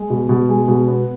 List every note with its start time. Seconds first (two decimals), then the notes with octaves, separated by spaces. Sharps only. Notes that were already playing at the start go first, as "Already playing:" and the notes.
Already playing: G#3
0.10 B2
0.29 B2
0.49 G#3
0.68 B2
0.87 B3